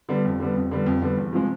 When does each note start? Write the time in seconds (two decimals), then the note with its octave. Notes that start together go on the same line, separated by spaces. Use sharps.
0.09 D3 G3 B3
0.25 F2
0.40 D3 G3 B3
0.56 F2
0.71 D3 G3 B3
0.86 F2
1.02 D3 G3 B3
1.18 E2
1.33 C3 F3 G#3